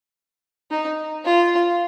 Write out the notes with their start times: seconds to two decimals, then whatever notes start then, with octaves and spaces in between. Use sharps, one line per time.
0.71 D#4
1.25 F4